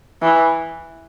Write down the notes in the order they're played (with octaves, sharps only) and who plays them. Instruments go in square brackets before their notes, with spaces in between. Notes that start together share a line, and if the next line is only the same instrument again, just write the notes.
[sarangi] E3